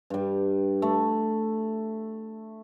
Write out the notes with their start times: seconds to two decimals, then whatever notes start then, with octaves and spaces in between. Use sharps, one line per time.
0.10 G2 G3
0.82 A3